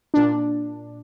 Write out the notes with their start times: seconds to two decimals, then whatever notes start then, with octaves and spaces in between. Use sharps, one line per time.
0.14 A#2 D4